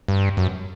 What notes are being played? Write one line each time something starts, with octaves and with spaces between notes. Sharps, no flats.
G2
F#2